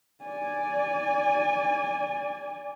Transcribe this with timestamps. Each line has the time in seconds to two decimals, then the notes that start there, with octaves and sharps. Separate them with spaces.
0.24 D5 G#5